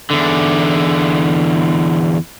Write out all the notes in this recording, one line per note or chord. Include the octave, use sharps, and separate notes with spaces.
E2 D3